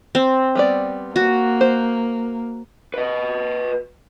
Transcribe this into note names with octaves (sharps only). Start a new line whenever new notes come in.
C4
G3 B3 D5
A#3 F#4
C5
B4 D#5